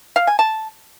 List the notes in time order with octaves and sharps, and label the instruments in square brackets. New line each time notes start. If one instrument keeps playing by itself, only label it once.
[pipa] F5
G#5
A5